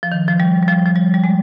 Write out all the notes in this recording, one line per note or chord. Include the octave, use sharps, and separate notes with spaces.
F3
D#3
F3
G3
G3
F3
F3
G3
G3
G#3